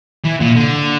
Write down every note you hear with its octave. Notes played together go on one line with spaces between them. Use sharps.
E3
A#2
D3